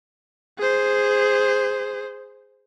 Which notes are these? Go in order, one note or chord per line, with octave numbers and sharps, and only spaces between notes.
G#4 C5